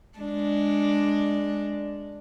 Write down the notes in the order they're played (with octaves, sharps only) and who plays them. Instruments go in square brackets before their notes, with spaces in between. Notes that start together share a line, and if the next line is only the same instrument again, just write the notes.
[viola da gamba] G#3 D4